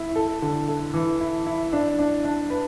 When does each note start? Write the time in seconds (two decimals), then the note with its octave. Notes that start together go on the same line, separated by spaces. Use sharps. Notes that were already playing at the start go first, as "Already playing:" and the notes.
Already playing: E4
0.16 A4
0.42 D3
0.68 A4
0.94 E3
1.20 E4
1.46 E4
1.73 D4
1.99 D4
2.24 D4
2.50 B4